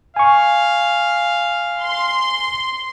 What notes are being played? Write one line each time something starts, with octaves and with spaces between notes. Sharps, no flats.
F5 G#5 C#6
C6